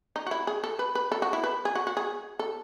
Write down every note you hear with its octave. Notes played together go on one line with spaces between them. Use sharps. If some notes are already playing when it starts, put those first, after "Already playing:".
D#4
F#4
E4
G#4
A4
B4
B4
A4
F#4
E4
B4
G#4
F#4
F#4
G#4
A4